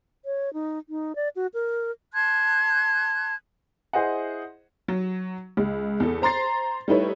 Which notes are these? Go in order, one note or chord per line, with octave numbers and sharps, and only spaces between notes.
C#5
D#4
D#4
D5
F#4
A#4
A5 C6 F#6 G#6
E4 G#4 C5 D#5 F#5
F#3
C#2
E2 A4
C5 A#5 C6 A6 C7
G3 A3 D#4 E4 B4 C#5